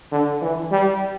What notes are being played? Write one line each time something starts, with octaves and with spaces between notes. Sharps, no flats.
D3
E3
G3